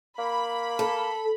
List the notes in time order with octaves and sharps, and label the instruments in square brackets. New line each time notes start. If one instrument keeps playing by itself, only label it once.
[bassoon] A#3 [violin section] B5
[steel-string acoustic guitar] A4